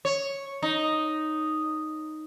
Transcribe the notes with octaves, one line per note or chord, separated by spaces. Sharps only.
C#5
D#4